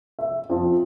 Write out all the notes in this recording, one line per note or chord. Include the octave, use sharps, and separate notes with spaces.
E5
F2